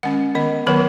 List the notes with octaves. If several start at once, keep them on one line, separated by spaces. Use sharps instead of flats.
D#3 G#3 C#4 F#5
D#3 B3 D#5
D#3 F#3 B3 B4